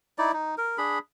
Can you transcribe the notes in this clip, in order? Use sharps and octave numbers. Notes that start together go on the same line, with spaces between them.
D#4 E4 D5
D#4
A#4
D4 G#4 B5